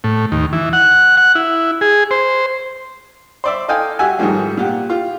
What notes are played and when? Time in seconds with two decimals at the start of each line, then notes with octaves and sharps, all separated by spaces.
0.04 A2
0.32 D#2
0.53 E3
0.73 F#5
1.17 F#5
1.35 E4
1.81 G#4
2.11 C5
3.44 C5 D5 E5
3.68 A4 D#5 F5 G5 G#5
3.99 F#4 G4 E5 F#5 G#5
4.19 G#2 D#3 F3 G3 A3
4.57 A#2 G4 F#5
4.90 F4 G4